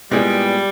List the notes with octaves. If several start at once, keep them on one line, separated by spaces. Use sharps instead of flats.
A#2 G3 G#3 B3 E4 G#4